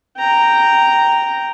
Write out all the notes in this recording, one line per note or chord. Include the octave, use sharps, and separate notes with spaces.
G5 A#5